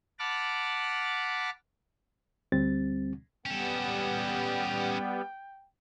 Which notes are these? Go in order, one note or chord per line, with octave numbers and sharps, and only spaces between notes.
F#5 A5 B5 D6 F6
D2 G3 C4 A6
G3 B3 C#4 A4 G5